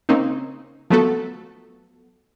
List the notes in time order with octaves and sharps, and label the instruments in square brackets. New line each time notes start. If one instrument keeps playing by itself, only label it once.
[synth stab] C#3 A#3 C4 D#4
F3 F#3 A3 B3 F#4 A4